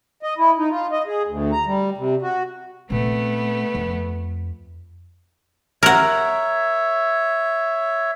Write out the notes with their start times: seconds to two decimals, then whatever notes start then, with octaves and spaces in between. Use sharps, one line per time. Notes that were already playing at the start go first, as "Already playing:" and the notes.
0.23 D#5
0.38 E4
0.58 D#4
0.70 F4
0.92 D#5
1.07 G#4
1.27 D2
1.52 A#5
1.66 G3
1.98 C3
2.22 F#4
2.90 A#2 A3 B3 C4
3.75 F2
5.83 A#4 C#5 E5 F#5